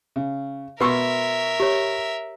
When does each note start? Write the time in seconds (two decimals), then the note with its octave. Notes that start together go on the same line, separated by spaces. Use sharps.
0.16 C#3
0.80 B2 A#4 B4 E5 C6 C#6 E6
1.60 G4 C#5